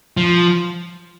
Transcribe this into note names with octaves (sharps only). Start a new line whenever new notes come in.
F3